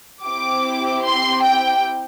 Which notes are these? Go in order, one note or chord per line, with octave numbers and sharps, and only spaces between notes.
C4 E4 G4 D6
C6
G5